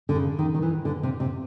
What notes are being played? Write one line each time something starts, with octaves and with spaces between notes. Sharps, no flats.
D3
C#3
D#3
D#3
E3
D3
C3
C3